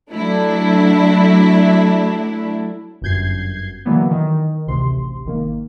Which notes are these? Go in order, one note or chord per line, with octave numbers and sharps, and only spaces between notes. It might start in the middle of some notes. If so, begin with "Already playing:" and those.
F#3 A3 D4 E4
G1 F#2 G6 G#6 C7
D3 E3 F#3 A#3 B3
D#3
A1 D2 C3 C6
G#1 D#3 A#3